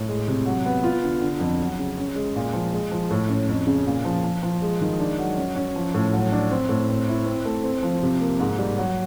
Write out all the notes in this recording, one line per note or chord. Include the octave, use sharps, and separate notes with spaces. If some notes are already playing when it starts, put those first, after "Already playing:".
Already playing: A2
G#3
C3
F#3
B3
F4
D3
D3
F2
F#3
C#3
C#4
G#3
A#2
F3
G#3
F3
A2
C#4
F2
C#3
A#2
F3
F3
F3
G#3
D#3
D4
F#3
C#4
C#4
F3
A2
F#3
D4
C4
A2
C4
E4
C4
A3
C4
F3
C3
A#3
G#2
G3
F#3